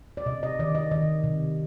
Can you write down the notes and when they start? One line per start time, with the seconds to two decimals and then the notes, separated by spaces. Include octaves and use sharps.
0.17 D5
0.26 C3 D#5
0.43 D#5
0.59 D#3 D5
0.75 D#5
0.91 D#3 D#5
1.23 C3